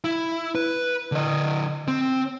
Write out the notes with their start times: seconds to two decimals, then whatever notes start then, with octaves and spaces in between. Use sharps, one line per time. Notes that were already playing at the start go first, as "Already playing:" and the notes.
0.04 E4
0.55 B4
1.12 D3 D#5
1.88 C4